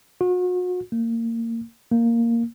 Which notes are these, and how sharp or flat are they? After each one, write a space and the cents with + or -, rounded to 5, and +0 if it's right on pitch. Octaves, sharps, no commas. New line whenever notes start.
F#4 -40
A#3 -25
A#3 -5